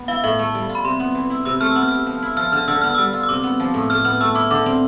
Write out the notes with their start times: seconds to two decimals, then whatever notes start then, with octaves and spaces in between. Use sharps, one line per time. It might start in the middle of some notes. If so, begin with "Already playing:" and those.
Already playing: B3
0.08 E4 F5
0.24 A2 E5
0.39 A3
0.54 G3
0.69 F4
0.75 B5
0.85 C3 C6
1.00 B3
1.15 E3
1.30 E4
1.45 C3 E6
1.60 A3 F6
1.72 B3 E6
1.83 F6
1.91 G4
2.06 F3
2.22 E4
2.37 F3 F6
2.52 D3 F6
2.68 D3 E6
2.81 B3 F6
2.95 G3 E6
3.13 F4
3.23 E6
3.29 C3 D6
3.43 B3
3.60 F3
3.74 A2
3.90 A2 F6
4.04 B3 F6
4.20 A3 E6
4.35 E4 D6
4.50 D3 D6
4.66 C4